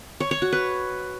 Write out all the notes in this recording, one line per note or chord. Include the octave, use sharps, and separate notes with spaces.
C#5
C#5
F#4
B4